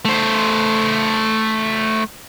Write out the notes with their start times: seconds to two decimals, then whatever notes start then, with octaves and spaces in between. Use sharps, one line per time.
0.05 A3 C5